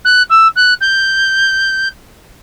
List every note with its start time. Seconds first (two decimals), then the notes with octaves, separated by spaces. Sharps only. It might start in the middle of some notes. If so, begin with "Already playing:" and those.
0.05 F#6
0.30 E6
0.56 F#6
0.81 G6